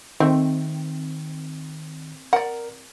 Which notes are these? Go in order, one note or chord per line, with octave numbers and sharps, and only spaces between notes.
D#3 A3 C4
A#4 D5 F#5